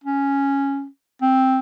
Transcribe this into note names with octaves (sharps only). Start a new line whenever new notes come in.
C#4
C4